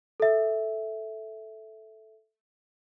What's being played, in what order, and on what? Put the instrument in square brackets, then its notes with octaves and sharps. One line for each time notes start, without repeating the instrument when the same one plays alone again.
[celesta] A4 E5